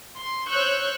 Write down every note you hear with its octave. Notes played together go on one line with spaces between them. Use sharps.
C6
C5 C#5 C#6 E6 F#6 G6